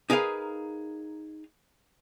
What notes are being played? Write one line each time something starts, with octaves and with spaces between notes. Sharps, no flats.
D#4 G#4 A#4 B4 F5